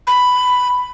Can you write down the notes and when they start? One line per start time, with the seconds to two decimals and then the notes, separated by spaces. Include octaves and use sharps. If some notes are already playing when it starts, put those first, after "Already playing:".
0.07 B5